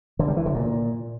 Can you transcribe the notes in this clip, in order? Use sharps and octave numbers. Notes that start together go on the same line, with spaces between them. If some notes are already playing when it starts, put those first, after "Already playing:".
D3
G3
E3
D3
A#2